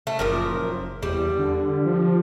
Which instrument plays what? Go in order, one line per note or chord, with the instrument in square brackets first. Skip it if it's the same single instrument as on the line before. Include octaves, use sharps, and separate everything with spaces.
[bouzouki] A3
[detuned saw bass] F#1 [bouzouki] A#2 F3 A#4
[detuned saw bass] E2 [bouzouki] G3
[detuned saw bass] D3
F3